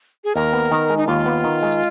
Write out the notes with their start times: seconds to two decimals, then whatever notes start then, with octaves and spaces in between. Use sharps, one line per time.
0.24 G#4
0.35 D#2 A#4
0.53 B3
0.71 D#3
0.90 G#3
0.97 D#4
1.07 D#2 F4
1.26 B3
1.44 D#3
1.62 G#3